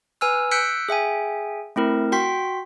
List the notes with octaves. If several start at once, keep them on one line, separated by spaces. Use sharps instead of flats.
B4 G#5 E6 F6
E6 F#6 G6 B6 C#7 D7
G#4 E5 G5 G#5
A3 C4 E4 A#4
F#4 G5 C6 B6